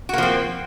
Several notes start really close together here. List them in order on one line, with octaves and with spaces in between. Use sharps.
F#4 A#3 F3 C4